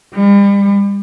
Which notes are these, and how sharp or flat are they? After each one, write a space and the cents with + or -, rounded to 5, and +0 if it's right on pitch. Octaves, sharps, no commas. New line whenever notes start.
G3 +40